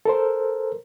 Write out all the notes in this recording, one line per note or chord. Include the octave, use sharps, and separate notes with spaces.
A4 A#4 C5